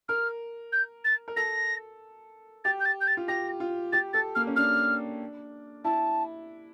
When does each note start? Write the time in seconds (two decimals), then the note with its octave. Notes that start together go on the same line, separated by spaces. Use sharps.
0.09 A#4 F6
0.72 G6
1.04 A6
1.28 A#4
1.36 A4 A#6
2.65 G4 A6
2.80 G6
2.85 A6
3.01 G6
3.07 A6
3.17 F4
3.28 G4 A#6
3.60 F4
3.93 G4 A6
4.13 A4 A6
4.35 A#3 F6
4.47 C#4
4.56 D4 F6
5.84 E4 A5